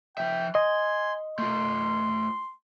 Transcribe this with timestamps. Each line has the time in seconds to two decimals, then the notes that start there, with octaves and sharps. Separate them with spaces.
0.18 F3 E5 G5
0.55 D#5 G#5 C6
1.38 A3 F4 C6